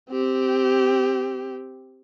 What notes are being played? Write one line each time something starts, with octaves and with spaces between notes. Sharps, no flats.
C4 G4